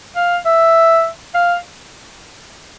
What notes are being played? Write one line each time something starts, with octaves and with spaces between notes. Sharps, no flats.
F5
E5
F5